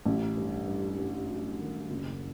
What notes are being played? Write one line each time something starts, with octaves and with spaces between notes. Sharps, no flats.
A1
G2
G2
G2
F#3
D#3
F#1